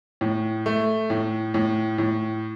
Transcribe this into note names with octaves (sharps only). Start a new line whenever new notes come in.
A2
A3
A2
A2
A2